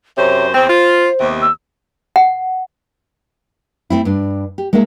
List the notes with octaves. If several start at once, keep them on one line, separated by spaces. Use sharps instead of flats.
F#2 C3 C5 C#5
E2 C4 C5
F4
D#2 C3 B3
E6
F#5
A3 C4 E4
G2 D4
G4
G#3 A#3 D#4 A#4 E5